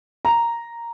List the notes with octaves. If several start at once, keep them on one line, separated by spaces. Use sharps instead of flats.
A#5